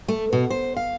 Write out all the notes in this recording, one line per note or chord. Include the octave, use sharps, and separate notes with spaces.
A3
B2
C5
F5